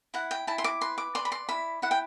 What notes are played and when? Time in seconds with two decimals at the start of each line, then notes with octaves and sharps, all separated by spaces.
0.14 E4 F#5
0.31 G5
0.47 E4 A5
0.58 C6
0.64 D6
0.81 B4 C6
0.98 D6
1.15 D5 C6
1.25 B5
1.32 C6
1.49 E4 B5
1.82 E4 F#5
1.91 G5